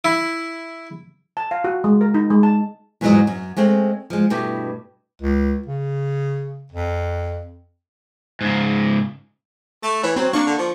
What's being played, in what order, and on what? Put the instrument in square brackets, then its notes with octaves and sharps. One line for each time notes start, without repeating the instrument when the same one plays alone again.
[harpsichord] E4
[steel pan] A5
F5
F#4
G#3
A#4
D#4
G#3
A5
[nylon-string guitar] E2 G#2 F3 F#3 G#3 D#5
F#2
G#3 A3 C4 C#4
F3 G#3
G2 B2 A3 E4 G4
[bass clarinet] C#2
C#3
F2
[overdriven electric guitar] G#2 C#3
[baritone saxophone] A3 [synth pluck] A6
[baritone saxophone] E3 [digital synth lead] C#5
[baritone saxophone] F#3 [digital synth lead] C4
[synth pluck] A#3 D4 D5 [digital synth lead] C#6
[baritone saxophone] D3
F3